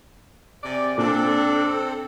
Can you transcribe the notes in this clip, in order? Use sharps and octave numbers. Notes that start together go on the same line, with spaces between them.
C3 G#4 D5
A#2 C4 D4 A4